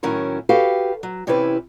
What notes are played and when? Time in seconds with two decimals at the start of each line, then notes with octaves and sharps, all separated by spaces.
0.03 A2 D#3 F#3 C#4 E4 A#4
0.49 F#4 G4 A4 B4 F5
1.03 F#3
1.27 C3 E3 C#4 E4 G4 B4